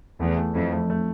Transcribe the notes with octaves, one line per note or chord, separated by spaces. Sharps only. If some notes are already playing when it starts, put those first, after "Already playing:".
E2 A3
A3
F2 E4
A3
A3